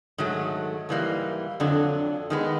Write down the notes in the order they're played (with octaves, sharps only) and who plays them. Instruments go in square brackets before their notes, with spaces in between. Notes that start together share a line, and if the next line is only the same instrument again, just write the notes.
[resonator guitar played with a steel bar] G#2 D#3 F#3 A3
G#2 E3 G3 A#3
F2 D3 F#3
D#3 G#3 B3